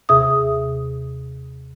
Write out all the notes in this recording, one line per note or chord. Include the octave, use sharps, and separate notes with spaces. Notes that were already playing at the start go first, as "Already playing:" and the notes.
D#2 C3 G#4 E5 D#6